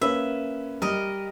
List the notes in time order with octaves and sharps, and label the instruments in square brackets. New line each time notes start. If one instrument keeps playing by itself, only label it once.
[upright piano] A#3 C#4 B4 [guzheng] E5
[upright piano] G3 [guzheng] A#4 D#5